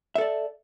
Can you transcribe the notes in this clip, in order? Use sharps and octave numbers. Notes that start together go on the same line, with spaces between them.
A4 D5 E5